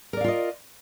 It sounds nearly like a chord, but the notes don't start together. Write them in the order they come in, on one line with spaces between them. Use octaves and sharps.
A#4 D5 F5 F4 D#5